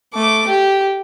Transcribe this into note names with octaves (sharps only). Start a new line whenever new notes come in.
A3 D6
G4